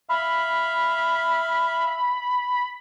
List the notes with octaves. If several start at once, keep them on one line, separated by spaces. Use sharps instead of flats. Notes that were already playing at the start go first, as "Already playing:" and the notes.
E5 F5 B5